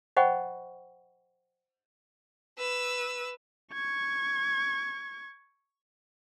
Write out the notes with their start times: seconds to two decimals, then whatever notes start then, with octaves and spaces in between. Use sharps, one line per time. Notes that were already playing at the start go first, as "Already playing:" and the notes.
0.17 C5 D#5 F#5 G5 B5 C#6
2.58 B4 E6
3.73 C#6 G#6